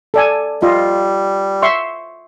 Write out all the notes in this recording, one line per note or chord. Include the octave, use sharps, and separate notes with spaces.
A4 D5 G#5
G3 F4 D#5
E5 C6 C#6